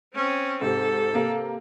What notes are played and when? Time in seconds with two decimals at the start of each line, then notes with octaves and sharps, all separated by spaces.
0.14 C4 C#4
0.61 G#2 C3 C4 A4
1.13 C3 A#3